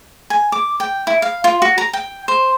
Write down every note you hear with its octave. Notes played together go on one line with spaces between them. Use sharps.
G#5
D6
G5
E4
F5
F4
F#4
A#5
G5
C5